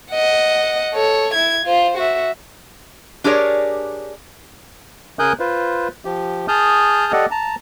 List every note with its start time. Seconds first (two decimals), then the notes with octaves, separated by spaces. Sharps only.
0.13 D#5 F#5
0.93 A4 C#5
1.34 E4 G#6
1.65 F4 C5
1.97 F#4 E5
3.24 D4 G4 G#4 A#4 C#5 D5
5.19 C#3 A#4 G#5 D#6 F#6 G6
5.40 F4 B4 C5
6.05 F3 G4
6.48 G#4 A5 D#6 F6 G6
7.12 G4 A4 D5 D#5 F#5
7.31 A5 A#5